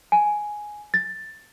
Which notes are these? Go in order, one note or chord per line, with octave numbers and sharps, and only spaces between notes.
G#5
A6